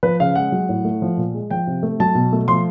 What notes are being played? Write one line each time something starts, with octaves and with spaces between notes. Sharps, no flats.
F3 B4
C#3 F5
G#3 F#5
F#3
A2
A3
F3
A#2
G#3
F3 G5
C3
A3
F#3 A5
B2
A3
F3 C6